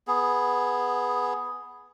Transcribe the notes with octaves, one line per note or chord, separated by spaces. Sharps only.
B3 G#4